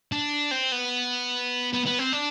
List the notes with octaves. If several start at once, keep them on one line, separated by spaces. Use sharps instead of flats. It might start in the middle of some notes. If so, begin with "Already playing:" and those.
D4
C4
B3
B3
B3
C4
D4